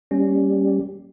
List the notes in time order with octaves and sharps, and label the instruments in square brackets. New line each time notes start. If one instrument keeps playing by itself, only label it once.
[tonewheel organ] G3 [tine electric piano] A#3 C#4